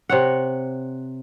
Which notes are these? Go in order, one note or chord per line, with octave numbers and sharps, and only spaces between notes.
C3 C#5 F#5